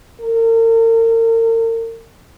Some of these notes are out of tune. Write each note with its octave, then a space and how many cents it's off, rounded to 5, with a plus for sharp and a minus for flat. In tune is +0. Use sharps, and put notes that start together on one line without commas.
A#4 -40